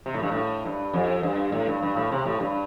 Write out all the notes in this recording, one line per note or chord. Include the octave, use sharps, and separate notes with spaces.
C3
A2
G2
A2
G2
F2
G2
A2
G2
G2
A2
C3
A2
G2